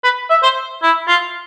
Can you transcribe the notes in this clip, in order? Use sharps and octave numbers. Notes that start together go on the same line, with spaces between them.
B4
E5
C5
E4
F4